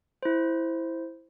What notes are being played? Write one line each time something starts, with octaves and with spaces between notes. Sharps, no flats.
E4 C5